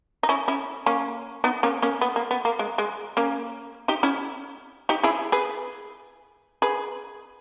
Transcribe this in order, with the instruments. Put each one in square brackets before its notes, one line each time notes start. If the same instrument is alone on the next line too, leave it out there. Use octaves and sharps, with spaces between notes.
[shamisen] D#4
C#4 E4
C#4 E4
A#3 C#4
B3 D#4
A#3 C#4
A#3 C#4
B3
A#3
B3
A#3
G#3
G#3
A#3 C#4
D#4 G4
C#4 E4
D#4 G4
E4 G#4
G#4 B4
G#4 B4